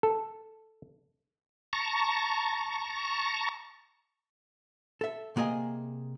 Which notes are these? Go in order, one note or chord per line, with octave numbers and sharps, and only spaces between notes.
A4
A5 A#5 C#6
A4 E5
C3 A#3 G#4 D#5 G#5